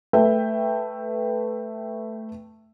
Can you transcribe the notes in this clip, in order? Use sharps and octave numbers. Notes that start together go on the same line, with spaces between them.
A3 B4 E5 G5